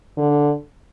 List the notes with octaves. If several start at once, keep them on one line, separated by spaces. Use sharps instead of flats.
D3